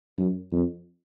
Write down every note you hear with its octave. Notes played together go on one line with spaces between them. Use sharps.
F#2
F2